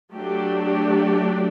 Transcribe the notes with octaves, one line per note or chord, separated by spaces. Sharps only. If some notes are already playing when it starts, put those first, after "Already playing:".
F#3 A3 D4 G4
G4